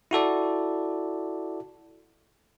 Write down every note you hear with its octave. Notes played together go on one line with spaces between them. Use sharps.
E4 F#4 A4 D5